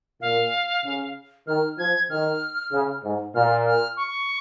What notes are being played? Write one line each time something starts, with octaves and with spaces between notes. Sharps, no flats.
A#2 F5
C#3
D#3 F6
F3 G#6
D#3 F6
C#3
G#2
A#2 F6
F6
C#6